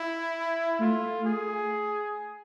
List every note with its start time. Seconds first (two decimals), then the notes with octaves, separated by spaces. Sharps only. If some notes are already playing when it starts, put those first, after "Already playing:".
Already playing: E4
0.80 A3 F4
1.25 G#4